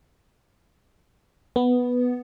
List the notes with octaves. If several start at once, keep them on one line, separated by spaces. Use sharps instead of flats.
B3